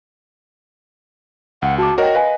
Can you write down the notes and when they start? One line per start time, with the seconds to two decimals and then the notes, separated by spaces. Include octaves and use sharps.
1.62 C#2 F#5
1.78 F#4 A5 D6
1.98 F#4 A#4 C#5 D#5 G5
2.15 B4 F5 G#5